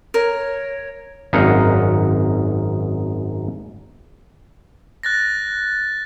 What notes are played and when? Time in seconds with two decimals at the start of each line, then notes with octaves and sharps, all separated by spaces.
0.14 A#4 C#5
1.33 G#1 F#2 D#4 F5 F#5
5.03 F#6 A6 A#6